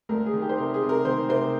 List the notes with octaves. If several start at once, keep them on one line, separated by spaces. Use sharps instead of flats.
D2 A#4
G#4
D#3
G4
C5
C3 A#4
G#4
C3
A#4
D#3 C5
C3 C5